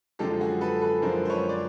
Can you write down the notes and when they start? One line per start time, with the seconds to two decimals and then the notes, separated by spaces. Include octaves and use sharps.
0.19 F#2 D3 F3 G#3 G4 A4
0.41 F#4 G#4
0.61 A4 B4
0.81 A4 B4
1.02 F#2 D3 F3 G#3 A#4 C5
1.25 C5
1.30 B4 C#5
1.49 D5